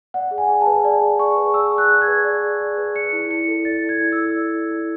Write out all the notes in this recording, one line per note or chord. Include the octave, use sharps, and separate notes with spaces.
D5 F#5
G#4
G#5
G#4
A5
B4
D5
G#4
G#4 C#6
B4
D5 E6
G#4
F#6
G#4
G#6
B4
D5
G#4
G#4
B4
D5 C#7
E4
E4 C#7
A4
D5 A6
E4
G#6
E4
E6
A4
D5
E4
E4